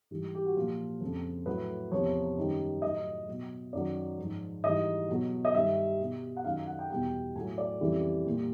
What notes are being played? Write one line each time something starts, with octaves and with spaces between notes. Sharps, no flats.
G#2 E3 G3
G4
F#4
A#2 F3 F4
F2 C#3 F3
A2 F#3 B4
E2 C3 F3 C#5
F#2 D#3 G3
A2 F#3 D#5
B2 F#3
F#2 D#3 F#3 D5
G#2 F3
G#2 E3 G3 D#5
B2 F#3
D#5
G2 D#3 G3 E5
B2 G3
F#5
F#2 D#3 F#3 F5
F#5
G5
E2 B2 G3 G5
A2 F#3 G#5
D5
F2 C#3 E3 G3
A#2 G3